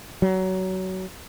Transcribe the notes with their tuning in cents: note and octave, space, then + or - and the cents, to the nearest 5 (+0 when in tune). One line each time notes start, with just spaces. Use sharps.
F#3 +20